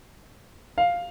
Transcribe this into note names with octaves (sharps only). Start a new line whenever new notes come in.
F5